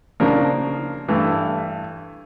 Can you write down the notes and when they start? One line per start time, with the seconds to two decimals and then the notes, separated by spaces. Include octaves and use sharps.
0.20 C#3 F3 A#3 D4
1.08 G2 E3 A3